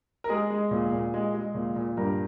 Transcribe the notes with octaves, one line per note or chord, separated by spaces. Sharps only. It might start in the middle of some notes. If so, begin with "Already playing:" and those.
A#4
G#3 G#4
G#3
A#2
A#2
G#3
G#3
A#2
A#2
G2 A#4